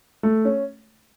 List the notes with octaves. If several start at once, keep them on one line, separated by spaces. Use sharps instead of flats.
A3
C#4